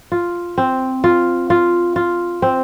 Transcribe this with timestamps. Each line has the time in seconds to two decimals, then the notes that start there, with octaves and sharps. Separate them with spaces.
0.12 F4
0.58 C4
1.04 F4
1.50 F4
1.96 F4
2.42 C4